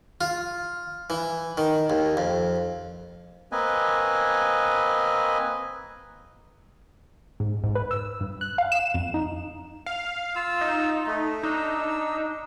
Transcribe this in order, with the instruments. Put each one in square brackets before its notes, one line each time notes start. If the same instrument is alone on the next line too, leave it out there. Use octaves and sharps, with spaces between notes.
[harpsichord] F4
E3
D#3
D#2
F2
[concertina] A#3 C4 B4 D#5 G#5
[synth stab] G#2
G#2
B4
E6
G2
F#6
F5
E7
F2
D#4
[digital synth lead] F5
[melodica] F4 E6
[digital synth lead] D#4
[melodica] A3
[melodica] D4 E6 [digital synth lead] D#4